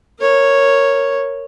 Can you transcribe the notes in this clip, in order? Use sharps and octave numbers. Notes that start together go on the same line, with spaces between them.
A#4 C#5